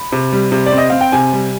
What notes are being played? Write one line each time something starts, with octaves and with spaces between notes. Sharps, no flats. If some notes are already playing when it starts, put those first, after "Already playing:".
Already playing: B5
C3
G3
C3
D5
C4
D#5
C4 F5
G5
C3 G#5
G3